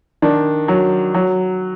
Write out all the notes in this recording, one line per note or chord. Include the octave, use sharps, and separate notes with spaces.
D#3 D4
F#3
F#3